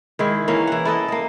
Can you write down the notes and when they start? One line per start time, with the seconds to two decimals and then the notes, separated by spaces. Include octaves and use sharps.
0.19 D#3 G#3 E4
0.48 E3 A#3 C#4
0.67 E3 F#5
0.85 E4 A4 D#5
1.08 A#3 D#5